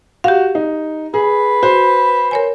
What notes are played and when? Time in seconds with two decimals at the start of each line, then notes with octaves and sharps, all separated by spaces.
0.24 F#4 G4 F5
0.55 D#4
1.14 G#4 B4
1.63 F#4 C5
2.31 A#4 C#5 G#5